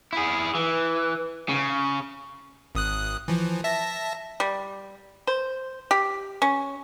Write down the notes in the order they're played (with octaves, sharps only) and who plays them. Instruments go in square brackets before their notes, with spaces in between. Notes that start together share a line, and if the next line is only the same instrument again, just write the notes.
[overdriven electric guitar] E4 G#4
E3
C#3
[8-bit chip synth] G#1 D#6 F#6
E3 F3
E5 A5 A#6
[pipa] G3
C5
G4
C#4